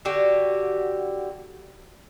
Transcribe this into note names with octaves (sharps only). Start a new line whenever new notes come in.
D3 F#4 G4